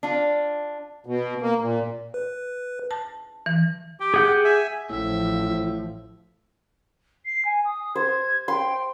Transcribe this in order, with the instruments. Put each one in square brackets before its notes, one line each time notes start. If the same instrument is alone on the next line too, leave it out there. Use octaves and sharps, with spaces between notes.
[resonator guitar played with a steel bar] D4 F4
[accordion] B2
A#3
A#2
[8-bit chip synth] B4
[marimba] A5
E3
[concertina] G4 G5
[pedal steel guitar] G#4 F#5 G6
[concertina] E5 G#5
[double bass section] A1 F3 [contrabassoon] A2 [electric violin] E5
[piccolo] C7
G#5
D#6
[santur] C5 [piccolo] G#6
[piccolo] G5 [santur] C6